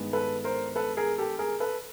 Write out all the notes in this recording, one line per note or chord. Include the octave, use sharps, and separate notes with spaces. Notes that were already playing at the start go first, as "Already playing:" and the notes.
Already playing: G2 D#3 G#3 B3
A4 B4
A#4 C5
A4 B4
G#4 A#4
G4 A4
G#4 A#4
A4 B4